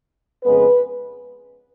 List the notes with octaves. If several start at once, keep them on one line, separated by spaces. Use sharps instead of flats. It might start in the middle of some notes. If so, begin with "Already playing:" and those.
F2 C#3 G#3 B3 B4